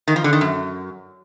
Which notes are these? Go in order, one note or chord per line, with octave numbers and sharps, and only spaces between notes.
D#3
F3
D3
D#3
F#2